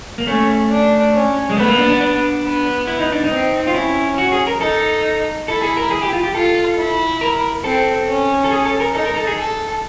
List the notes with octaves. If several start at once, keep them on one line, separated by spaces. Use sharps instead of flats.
A#3
A3 C#4
D4
C#4
G#3
A3 B3
A#3
D4
D4
D4
B3
E4
D#4
D4
D#4
C4
F4
C#4 E4
F#4
G#4
A#4
D#4 A4
E4 A4
G#4
A#4
G#4
G4
F4
G4
F4 A4
E4
A#4
C4 A4
C#4
A4
G#4
A4
A#4
D#4 A4
A#4
A4
G#4
A4